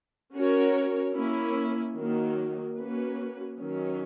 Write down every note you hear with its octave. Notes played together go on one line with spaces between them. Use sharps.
C#4 F#4 A#4 C#5
A#3 C#4 E4
D#3 F#3 A#3
A#3 C#4 F#4 B4
D#3 F#3 C#4